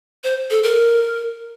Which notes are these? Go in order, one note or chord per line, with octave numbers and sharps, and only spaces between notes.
C5
A4
A#4